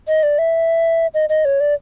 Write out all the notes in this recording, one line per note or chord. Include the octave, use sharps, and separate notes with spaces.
D#5
D5
E5
D#5
D#5
C#5
D5